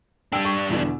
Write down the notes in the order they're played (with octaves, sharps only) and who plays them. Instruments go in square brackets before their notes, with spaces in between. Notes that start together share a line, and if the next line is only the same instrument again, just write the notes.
[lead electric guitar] G3 D4 [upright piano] G5 E6 D7
[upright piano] C#6
E2 B2 D3